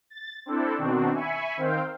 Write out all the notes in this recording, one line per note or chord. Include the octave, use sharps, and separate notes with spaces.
A6
C4 D4 E4 A4
B2 D#3 C4 D4 F#4
E5 G#5 B5 C#6
D#3 C4 C5 F5 G5